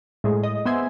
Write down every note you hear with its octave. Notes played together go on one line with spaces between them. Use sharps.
A2 G#3
D#5
B3 C5 E5 G#5